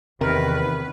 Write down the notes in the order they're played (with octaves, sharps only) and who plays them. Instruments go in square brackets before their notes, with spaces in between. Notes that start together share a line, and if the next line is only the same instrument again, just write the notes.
[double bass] E2 D#3 [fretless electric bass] C3 [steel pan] A#4 [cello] B4